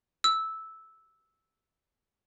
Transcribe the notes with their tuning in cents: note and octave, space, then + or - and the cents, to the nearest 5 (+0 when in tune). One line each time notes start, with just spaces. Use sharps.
E6 -10